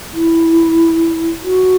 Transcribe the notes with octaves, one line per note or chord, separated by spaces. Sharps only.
E4
F#4